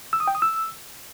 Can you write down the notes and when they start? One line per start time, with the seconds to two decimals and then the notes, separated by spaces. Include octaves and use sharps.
0.13 E6
0.20 D#6
0.28 G5
0.35 D#6
0.42 E6